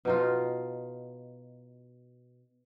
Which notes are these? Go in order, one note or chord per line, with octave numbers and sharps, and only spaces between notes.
B2 D#4 F4